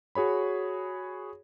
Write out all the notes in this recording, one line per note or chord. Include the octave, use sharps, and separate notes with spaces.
F#4 G#4 C#5 B5